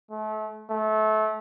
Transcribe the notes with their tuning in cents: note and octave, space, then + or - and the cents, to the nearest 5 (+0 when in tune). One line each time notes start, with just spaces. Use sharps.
A3 -35
A3 -25